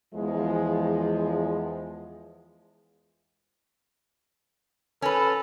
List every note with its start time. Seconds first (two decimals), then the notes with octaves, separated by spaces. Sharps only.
0.14 E2 F3 G#3
5.02 C#4 A4 B4